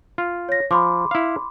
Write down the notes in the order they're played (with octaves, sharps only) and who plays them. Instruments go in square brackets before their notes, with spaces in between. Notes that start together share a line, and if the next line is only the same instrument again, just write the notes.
[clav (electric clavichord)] F4
[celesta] C#5 A#6
[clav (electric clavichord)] F3 [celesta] B5 C6 D6
[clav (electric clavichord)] E4 F5